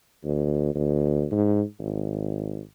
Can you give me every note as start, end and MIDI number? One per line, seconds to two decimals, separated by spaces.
0.24 0.73 38
0.75 1.25 38
1.32 1.62 44
1.79 2.60 32